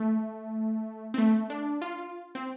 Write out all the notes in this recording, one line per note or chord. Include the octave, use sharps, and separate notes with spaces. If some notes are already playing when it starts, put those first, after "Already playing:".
Already playing: A3
C4
A3
D4
F4
C4